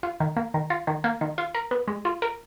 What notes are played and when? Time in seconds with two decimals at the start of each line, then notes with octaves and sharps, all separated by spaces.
0.03 F4
0.20 D#3
0.36 A#3
0.54 D#3
0.70 F4
0.87 D#3
1.04 A#3
1.21 D#3
1.38 F4
1.54 A#4
1.71 B3
1.88 G#3
2.05 F4
2.22 A#4